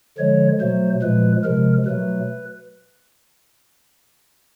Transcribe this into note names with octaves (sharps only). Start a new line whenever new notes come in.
D3 F3 G#3 C#5
B2 F#3 A3 C5
A#2 F3 G#3 B4
C3 F3 G#3 A#4
B2 F#3 A3 B4